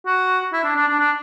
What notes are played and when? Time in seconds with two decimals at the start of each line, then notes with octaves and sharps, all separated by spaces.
0.06 F#4
0.53 E4
0.64 D4
0.76 D4
0.88 D4
0.99 D4